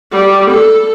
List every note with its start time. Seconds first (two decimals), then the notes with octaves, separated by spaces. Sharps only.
0.12 G3
0.51 A4